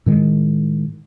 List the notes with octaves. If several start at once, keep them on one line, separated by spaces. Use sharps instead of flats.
A2 D#3 G#3